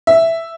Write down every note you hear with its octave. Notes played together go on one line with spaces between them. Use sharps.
E5